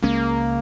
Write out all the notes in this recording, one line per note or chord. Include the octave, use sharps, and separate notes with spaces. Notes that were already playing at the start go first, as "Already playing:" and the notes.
C#2 C#3 G#3 A#3 C#4